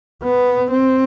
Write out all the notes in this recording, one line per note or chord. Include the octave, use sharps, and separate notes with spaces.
B3
C4